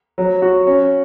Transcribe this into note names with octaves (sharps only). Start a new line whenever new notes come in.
F#3
F#4
C#4